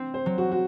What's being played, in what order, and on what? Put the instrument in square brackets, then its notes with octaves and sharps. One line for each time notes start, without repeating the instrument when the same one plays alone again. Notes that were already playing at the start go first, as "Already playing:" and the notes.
Already playing: [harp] C4
[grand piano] C5
[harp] F#3
[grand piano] F#4
F#4